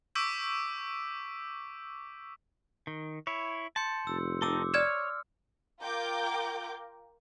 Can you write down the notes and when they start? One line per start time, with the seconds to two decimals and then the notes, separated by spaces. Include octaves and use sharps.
0.15 C#6 D6 E6 G6 B6 D7
2.87 D#3
3.27 E4 C#5
3.76 A5 C6 G6 C#7
4.07 F1 E6
4.42 C4 D#4 A4 D6 E6
4.74 C#5 D5 F6 G#6 E7
5.82 F4 A#4 G5 D6 G6